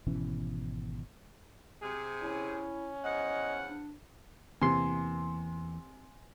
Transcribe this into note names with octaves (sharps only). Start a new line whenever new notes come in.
G#1 B2 E3 C#4
C3 G#4
C#4 E4
E2 F3 D#5 F#5
D4
E2 C3 E3 A#3 G#5 C6